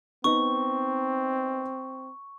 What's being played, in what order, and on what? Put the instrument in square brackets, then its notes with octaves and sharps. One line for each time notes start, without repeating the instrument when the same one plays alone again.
[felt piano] B3 D#4 [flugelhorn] C4 [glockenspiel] C#6